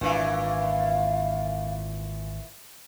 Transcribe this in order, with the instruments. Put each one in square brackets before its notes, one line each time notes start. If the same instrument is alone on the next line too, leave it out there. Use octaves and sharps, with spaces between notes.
[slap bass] G#1 D4 [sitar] A#2 E3 [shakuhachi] F5